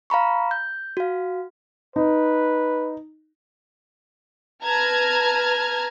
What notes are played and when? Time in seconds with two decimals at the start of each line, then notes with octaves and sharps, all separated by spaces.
0.10 F5 A#5 B5 C#6
0.51 G6
0.97 F#4 F5
1.96 D#4 B4
4.64 B4 A5 A#5 F6 G#6